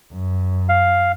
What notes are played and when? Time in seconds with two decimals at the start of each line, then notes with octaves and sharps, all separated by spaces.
0.12 F#2
0.69 F5